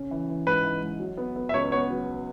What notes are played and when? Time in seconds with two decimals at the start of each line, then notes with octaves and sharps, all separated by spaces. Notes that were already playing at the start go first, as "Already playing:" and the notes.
Already playing: C#3 C#4
0.11 E3
0.29 E3
0.47 G#2 B4
0.65 E3
0.82 G#2
1.00 F#3
1.17 B3
1.36 B3
1.49 E5
1.53 C#2 C#5
1.72 B3 C#5
1.90 F#3